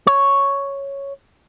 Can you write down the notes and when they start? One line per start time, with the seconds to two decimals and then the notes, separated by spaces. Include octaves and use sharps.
0.07 C#5